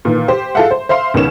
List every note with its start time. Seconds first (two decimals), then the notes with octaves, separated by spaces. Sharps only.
0.05 A#2 D#3 E3
0.28 G4 C5
0.55 F4 G#4 A4 E5 F#5
0.71 C5
0.89 C5 E5 F5 C6
1.14 C#2 B2 D#3 C#4 E7